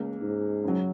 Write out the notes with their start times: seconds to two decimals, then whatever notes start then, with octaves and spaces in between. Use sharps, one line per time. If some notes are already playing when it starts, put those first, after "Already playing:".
Already playing: C#2 C#3 A#3
0.22 G#2
0.64 F#2 C#3 F#3